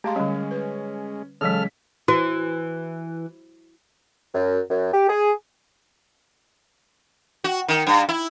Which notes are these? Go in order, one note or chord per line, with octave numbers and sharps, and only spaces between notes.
G#3 A3 G4 F5 A5 A#5 C6
D3 G3 C#4
B4
C#3 E3 F#3 G#3 C#4 A4 F6 B6
E3 F#4
F#2
F#2
G4
G#4
F#4
D#3
G2
E4